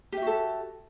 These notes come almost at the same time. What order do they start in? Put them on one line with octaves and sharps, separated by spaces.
G4 E5 F#4 A4